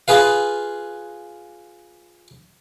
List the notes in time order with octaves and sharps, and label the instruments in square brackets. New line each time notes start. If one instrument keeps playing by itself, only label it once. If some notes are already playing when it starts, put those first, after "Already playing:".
[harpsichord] F4 G#4 B4 F5